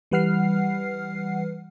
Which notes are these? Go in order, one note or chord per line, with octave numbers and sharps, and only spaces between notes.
E3 G3 B4 F#5 F6 C7